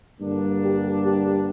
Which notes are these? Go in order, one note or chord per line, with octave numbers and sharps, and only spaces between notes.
G2 D3 A#3 D4
G4
G4